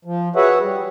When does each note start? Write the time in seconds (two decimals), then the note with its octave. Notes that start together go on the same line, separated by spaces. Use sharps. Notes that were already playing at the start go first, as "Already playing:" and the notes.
0.05 F3
0.36 F#4 G#4 B4 C#5 E5 F#5
0.61 G3